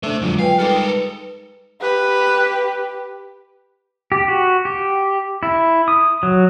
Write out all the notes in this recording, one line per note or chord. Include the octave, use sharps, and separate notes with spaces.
A3 D4 C5 E5
F2 D3 F#3 G#3 F4
G4 B4 F5 G#5
G3 G#3 D#4 F4 G4 A4 A#4 D5
D#6
G4 B4
G4
F#4
G4
E4
D#6
F#3